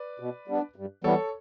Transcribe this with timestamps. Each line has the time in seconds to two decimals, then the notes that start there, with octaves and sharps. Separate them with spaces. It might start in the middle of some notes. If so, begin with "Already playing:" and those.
Already playing: B4 D5
0.20 B2
0.48 G3 B3 D4
0.76 G2
1.04 E3 G3 B3 A4 C#5